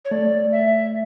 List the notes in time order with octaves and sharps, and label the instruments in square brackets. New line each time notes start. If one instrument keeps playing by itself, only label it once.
[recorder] C#5
[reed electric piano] A3 [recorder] D5
[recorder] E5